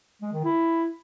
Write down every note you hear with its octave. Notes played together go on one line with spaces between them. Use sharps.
G#3
D#3
E4